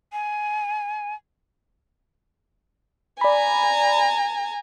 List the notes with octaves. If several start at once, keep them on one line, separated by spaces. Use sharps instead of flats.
G#5
D5 G#5 A#5 B5